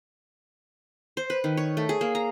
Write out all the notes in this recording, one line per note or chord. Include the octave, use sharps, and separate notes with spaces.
C5
B4
D#3
C#5
A3
G#4
A#3
A#5